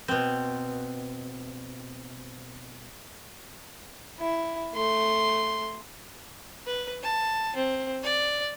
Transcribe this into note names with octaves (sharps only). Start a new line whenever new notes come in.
B2 C4
E4
A3 C6
B4
A5
C4
D5